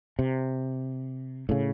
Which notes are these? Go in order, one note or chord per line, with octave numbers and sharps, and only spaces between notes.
C3
A2 C#3